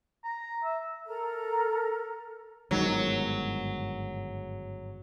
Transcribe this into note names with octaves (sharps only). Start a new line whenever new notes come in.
A#5
E5
A4 A#4 A#5
G1 G#2 D#3 F#3